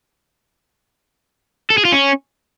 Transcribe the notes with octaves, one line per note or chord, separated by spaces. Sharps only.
A4
G#4
F4
C#4